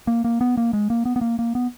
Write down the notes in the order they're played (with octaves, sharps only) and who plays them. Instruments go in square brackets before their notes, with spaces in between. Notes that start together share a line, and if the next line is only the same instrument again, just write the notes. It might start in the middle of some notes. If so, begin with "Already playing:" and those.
[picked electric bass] A#3
A#3
B3
A#3
G#3
A#3
B3
B3
A#3
A#3
B3